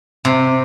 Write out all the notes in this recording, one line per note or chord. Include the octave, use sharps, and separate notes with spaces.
C3